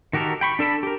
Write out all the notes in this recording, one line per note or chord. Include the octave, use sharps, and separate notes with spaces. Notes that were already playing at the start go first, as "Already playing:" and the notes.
D#3 F#4 G4 A4 A#4
G5 B5 C#6
D4 A4 A5 B5
G4 A#4